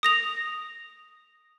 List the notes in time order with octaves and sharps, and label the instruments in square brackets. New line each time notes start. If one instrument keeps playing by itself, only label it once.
[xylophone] D#6 A#6 F7